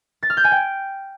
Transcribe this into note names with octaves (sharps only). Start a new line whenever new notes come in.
A6
F6
G6
G#5
G5